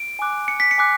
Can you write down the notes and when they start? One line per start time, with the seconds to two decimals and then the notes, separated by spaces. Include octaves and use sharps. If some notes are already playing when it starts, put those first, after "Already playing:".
Already playing: D7
0.19 G#5 D6 F#6
0.48 C#7
0.60 B6
0.71 C#7
0.78 G#5 D6 F#6